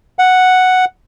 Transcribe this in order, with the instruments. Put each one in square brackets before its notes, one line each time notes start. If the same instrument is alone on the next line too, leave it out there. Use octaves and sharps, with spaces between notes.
[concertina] F#5